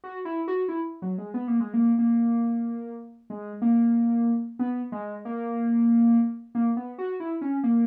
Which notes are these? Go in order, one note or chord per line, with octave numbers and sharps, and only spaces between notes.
F#4
E4
F#4
E4
F#3
G#3
B3
A#3
G#3
A#3
A#3
G#3
A#3
B3
G#3
A#3
A#3
B3
F#4
E4
C#4
A#3